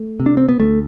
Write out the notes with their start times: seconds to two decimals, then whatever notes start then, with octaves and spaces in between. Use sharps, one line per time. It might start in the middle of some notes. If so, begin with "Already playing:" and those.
Already playing: A3
0.20 C3
0.26 D4
0.37 C4
0.49 B3
0.60 D2 A3